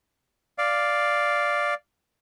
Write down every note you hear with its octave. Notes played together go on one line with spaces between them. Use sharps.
D5 F5